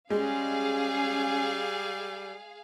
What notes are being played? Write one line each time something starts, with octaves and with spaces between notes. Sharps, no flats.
G3 G#3 C#4 G#4 F5